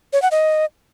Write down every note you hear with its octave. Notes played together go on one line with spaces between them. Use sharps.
C#5
F#5
D#5